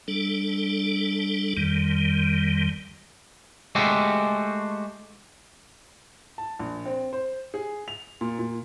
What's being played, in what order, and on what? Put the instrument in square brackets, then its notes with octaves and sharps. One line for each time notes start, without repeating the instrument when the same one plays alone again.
[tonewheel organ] G3 D4 A4
F2 D#3 G3
[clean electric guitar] G#3 A3 F#4 G4 A4
[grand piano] A5
A#1
C4
C5
G#4
F7
A#2
A#2